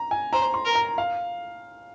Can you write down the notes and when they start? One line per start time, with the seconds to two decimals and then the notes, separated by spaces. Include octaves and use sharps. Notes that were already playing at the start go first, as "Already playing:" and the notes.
Already playing: A#5
0.11 G#5
0.33 C5 A#5
0.54 C6
0.65 A#4
0.75 A#5
0.98 F5